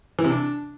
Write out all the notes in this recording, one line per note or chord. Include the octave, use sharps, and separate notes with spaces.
E3
C3
D4